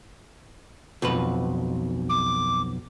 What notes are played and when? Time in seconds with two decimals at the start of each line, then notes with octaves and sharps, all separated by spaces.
1.02 B1 F2 B4
2.09 D6